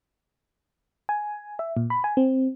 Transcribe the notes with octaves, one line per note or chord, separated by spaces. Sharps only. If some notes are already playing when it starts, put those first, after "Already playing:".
G#5
E5
A#2
B5
G#5
C4